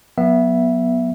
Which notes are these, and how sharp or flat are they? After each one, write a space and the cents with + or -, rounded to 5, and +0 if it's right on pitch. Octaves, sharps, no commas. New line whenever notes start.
F#3 -30 B3 -20 E5 +10